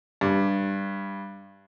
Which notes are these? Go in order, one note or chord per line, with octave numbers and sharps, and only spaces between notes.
G2